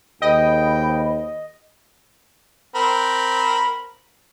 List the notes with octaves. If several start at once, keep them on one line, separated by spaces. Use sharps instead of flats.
D#2 G#4 C5 D#5 G5 B5
C4 A#4 B5